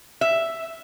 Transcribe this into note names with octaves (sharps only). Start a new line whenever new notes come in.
E5